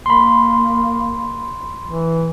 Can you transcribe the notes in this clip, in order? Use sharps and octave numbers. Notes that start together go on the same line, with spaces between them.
A#3 B5 C6
E3